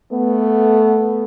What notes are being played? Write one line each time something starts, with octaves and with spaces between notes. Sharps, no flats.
A3 B3